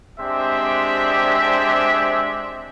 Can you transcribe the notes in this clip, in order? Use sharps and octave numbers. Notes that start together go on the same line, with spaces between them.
G#3 C4 D4 G4 C5 E5